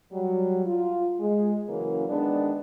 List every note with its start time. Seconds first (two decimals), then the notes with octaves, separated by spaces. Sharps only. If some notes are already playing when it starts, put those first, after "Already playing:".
0.11 F#3 G3
0.65 F4
1.19 G#3
1.67 C#3 E3 F#3 A#3 C#4
2.08 D#3 G#3 B3 D4